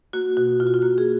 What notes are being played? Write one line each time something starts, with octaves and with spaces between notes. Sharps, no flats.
A#3 F#4
B2 F#4
B2 F4
F#4
F4
A#3 F#4
G#4